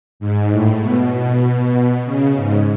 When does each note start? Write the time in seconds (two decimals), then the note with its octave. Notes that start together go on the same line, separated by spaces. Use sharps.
0.20 G#2
0.52 A2
0.81 B2
1.13 B2
2.05 C#3
2.36 G#2